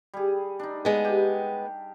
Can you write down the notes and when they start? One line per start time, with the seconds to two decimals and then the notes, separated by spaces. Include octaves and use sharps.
0.14 G3 G#4
0.59 D4 D#4
0.85 G#3 B3
1.05 G4